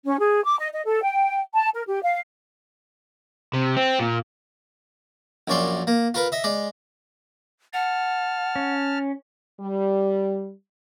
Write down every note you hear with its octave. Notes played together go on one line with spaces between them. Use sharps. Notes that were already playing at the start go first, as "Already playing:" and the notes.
C#4
G#4
D6
D#5
D#5
A4
G5
A5
A#4
G4
F5
C3
C4
A#2
A#1 F#2 C#5 D5 C6
A#3
F4 A#4 B4
D#5 E5
G#3 D5
F#5 A5 F6
C#4
G3